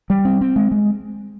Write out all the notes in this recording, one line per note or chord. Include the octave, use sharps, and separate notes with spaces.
G3
C4
C4
G#3
G#3